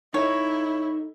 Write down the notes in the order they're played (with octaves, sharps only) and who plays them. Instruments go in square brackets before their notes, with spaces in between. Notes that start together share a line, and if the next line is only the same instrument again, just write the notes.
[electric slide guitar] D#4 A4 D#5 [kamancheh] E4 [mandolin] C#5